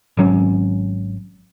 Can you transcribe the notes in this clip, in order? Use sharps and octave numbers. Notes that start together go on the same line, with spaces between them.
G#1 F#3 C#4